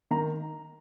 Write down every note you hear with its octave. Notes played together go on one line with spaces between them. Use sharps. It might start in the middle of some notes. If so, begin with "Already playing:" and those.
D#3 A#5